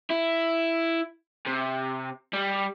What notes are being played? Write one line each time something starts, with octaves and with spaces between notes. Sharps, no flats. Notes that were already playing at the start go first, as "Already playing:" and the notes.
E4
C3
G3